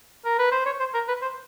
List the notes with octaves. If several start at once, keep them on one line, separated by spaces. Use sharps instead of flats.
A#4
B4
C5
C#5
C5
A#4
B4
C5